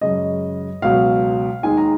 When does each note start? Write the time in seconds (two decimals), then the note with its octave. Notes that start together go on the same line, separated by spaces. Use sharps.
0.01 F#2 C#3 G#3 D#5
0.82 C#2 B2 F#3 F5
1.63 D#2 D#3 G#3 G#5
1.77 A#5